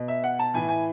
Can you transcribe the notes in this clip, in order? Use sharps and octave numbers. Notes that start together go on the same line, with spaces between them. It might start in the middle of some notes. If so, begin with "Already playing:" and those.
Already playing: B2
E5
F#5
A5
A2 E3 G#5
G#5